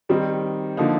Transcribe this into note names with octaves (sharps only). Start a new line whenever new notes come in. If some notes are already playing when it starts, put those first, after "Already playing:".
D#3 G3 C4 D#4
D3 F3 A#3 D#4